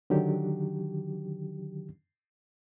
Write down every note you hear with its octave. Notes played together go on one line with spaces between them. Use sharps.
D3 D#3 F#3 G4